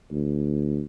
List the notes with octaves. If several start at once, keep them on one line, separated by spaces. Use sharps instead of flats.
D2